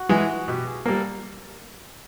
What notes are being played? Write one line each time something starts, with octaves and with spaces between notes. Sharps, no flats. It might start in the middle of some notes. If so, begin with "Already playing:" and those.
Already playing: F#4
E3 G#3
B2 G4
G#4
G3 A#3 A4